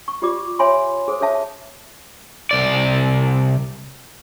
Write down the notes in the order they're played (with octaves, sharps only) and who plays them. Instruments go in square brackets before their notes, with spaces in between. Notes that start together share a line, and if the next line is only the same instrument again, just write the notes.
[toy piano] C#6
F4 G4 D5 D6
C#5 E5 G#5 B5 C6
G#4 A4 C5
G#4 A4 C#5 E5 A5
[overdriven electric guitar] C2 D5